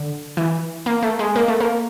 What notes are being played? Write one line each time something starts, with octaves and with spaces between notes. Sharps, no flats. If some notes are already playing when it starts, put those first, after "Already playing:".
Already playing: D3
E3
A#3
A3
G#3
A#3
A3
A#3